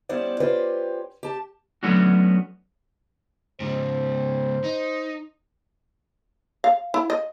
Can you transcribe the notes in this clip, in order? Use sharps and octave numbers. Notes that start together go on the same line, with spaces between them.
G3 B3 C#4 E4 C5 D5
C#4 F4 G4 B4 C5 D5
G4 A5
F#3 A3 B3 C#4 D4 F#4
G#2 C#3 C5
D#4
F5
E4
D#5